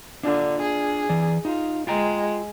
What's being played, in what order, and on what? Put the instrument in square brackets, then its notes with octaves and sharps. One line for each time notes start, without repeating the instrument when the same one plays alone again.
[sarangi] D3 [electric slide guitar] D4 F4
[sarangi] G#4
[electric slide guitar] E3 D5
[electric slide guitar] D#4 [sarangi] F4
[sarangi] G#3 [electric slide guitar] F4 G5 A#5